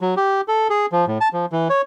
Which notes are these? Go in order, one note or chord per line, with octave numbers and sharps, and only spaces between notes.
F#3
G4
A4
G#4
F3
A2
A5
F3
E3
C#5